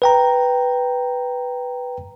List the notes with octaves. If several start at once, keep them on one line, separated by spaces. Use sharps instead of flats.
B4 G5 A#5